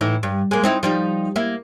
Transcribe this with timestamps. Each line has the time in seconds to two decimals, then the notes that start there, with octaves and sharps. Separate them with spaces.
0.01 A2 E3 D#4
0.23 G2
0.51 G#3 A#3
0.64 C4 D#4 E4
0.83 F3 G3 D#4
1.36 A#3 E4